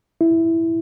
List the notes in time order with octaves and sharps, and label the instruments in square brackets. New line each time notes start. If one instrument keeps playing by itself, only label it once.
[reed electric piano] E4